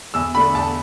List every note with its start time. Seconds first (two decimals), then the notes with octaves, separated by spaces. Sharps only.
0.14 E2 E6
0.34 D3 A3 D4 B5
0.55 E2 A5